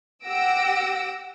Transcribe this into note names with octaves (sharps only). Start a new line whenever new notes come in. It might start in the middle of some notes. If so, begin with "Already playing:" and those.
G4 F#5 E6 A#6 D7